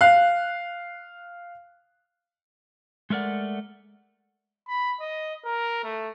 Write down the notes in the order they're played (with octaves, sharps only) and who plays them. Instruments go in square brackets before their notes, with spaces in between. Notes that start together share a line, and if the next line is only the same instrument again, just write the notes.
[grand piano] F5 F#6
[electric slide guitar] G#3 A3 A#4 D5 F#5
[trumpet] B5
D#5
A#4
A3